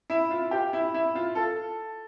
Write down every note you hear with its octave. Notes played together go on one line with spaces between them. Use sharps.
E4
F4
G4
E4
E4
F4
A4